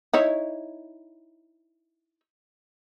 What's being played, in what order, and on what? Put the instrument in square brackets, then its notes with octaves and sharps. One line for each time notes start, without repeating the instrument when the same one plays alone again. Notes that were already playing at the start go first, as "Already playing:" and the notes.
[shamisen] D#4 E4 C#5